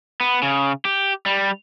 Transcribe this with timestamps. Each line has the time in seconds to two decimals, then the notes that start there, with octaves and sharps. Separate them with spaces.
0.21 B3
0.43 C#3
0.85 G4
1.26 G3